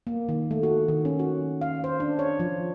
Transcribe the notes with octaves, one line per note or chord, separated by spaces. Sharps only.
A#3
D#3
A3
F#4
D#3
C#4
F#4
F5
C5
D4
C#5
F3